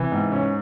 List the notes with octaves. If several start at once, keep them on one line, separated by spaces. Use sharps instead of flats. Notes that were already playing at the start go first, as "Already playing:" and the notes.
Already playing: C3 E3
G#2
C#4